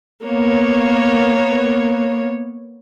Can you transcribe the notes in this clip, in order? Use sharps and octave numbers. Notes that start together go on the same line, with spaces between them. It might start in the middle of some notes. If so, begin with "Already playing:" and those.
A#3 B3 C#5